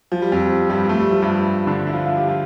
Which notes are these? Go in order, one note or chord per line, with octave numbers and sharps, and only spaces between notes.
F3
G3
F2 F3
G2 G3
A3
G3
F3
G2 G3
D3 D4
E4
F3 F4
F4
G4
F3 F4